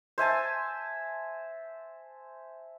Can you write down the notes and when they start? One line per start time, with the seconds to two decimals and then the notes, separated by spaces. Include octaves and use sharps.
0.18 C5 E5 G#5 A5